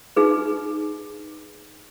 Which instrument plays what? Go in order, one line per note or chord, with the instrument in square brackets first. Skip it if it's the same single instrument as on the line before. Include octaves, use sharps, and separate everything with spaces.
[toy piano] D#4 G#4 B4